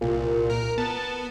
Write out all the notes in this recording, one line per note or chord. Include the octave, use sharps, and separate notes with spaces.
C2 A#2
A#4
B3 A5